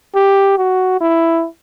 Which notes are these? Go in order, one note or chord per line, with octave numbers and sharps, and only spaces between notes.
G4
F#4
E4